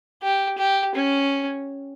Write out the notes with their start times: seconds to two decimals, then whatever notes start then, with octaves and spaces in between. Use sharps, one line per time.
0.23 G4
0.58 G4
0.95 C#4